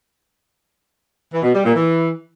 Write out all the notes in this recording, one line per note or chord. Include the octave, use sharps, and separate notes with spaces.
E3
B2
G3
A#2
E3